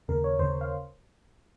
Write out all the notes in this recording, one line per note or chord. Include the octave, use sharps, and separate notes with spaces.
D#2 C#3 A#4
C#5
D#2 C#3 C5
F5